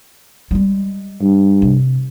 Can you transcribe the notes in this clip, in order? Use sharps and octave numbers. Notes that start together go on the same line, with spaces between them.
G3 G#3
G2
C3